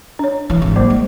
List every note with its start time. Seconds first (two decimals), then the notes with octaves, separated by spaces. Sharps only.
0.19 D4 C#5
0.50 E3
0.62 G#1
0.76 F#3 A#3 C5
0.90 G#3